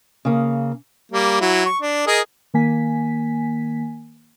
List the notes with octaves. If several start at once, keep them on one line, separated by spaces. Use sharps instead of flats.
C#3 A#3
G3 A#3
F#3 E4
C#6
D4
G#4 A#4 D#5
D#3 A#3 G#5 B6